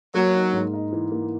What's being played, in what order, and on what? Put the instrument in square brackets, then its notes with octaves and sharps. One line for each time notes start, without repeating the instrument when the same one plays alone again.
[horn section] F#3 [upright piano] A#3
[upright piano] D#4
G#2
D#4
E3
A#3